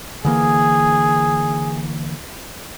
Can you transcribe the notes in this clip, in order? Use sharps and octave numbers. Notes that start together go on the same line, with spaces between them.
D3 E3 A#3 G#4